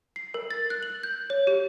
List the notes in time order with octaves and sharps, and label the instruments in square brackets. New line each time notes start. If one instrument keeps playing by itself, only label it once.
[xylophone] C7
A#4
A6
F#6
F#7
G6
C#5
G4